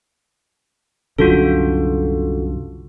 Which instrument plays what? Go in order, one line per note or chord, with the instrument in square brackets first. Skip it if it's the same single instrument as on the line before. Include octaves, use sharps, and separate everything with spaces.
[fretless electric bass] C2 F#2 D3 [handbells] F4 F#4 A4